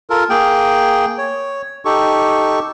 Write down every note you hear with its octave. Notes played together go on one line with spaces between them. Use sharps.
F4 A4 A#4
A#3 G#4 G5
C#5
D#4 G4 A4 C#6